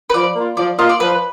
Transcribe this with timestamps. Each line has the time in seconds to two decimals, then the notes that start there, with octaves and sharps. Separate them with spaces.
0.10 B4
0.14 F3 D5
0.36 A#3 F4
0.57 F3 D5
0.79 A#3 F4 D#5
0.89 D5
1.00 F3 B4